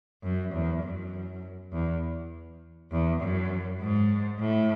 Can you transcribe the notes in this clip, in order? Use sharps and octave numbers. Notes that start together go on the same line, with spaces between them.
F#2
E2
F#2
E2
E2
F#2
G#2
A2